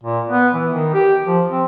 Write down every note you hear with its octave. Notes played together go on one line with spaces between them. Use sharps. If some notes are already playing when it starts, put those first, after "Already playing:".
A#2
B3
E3
D#3
G4
F3
C4